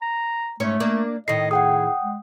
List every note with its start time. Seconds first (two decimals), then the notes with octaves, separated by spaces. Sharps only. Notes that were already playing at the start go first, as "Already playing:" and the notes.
0.01 A#5
0.60 G#2 A3 C#4 C#5
0.80 A#3 D4
1.28 A2 D#3 D#5 C7
1.51 G#4 F#5 G5 D#6
2.03 G#3